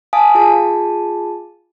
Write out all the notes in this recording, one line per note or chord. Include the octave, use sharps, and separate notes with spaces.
F5 G#5 A5 D#6
F4 G#4 A5